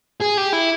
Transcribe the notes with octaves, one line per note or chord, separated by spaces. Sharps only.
G#4
G4
E4